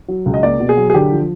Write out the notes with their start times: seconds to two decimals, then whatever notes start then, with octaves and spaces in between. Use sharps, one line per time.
0.08 F#3
0.26 C#2
0.34 D#5
0.43 A#3 D5
0.60 B2
0.69 G#4
0.77 F#3
0.90 G#4
0.94 D3 G4
1.12 F3